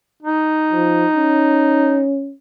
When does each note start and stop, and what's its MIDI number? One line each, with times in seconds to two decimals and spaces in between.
0.23 2.02 63
0.73 1.05 53
1.16 2.34 61